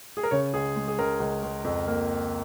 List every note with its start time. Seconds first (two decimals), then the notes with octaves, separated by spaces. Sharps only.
0.17 G#4
0.23 A#4
0.31 C#3 C#5
0.53 C#2 G#4
0.76 G#3
0.88 G#4
0.98 C#2 A#4
1.20 C#2
1.43 C#2
1.64 F2
1.87 A#3